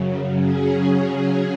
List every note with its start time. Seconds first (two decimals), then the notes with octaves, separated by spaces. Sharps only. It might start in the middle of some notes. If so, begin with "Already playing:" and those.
Already playing: F#2 C#3 F#3
0.39 C#3 F#3 C#4 G#4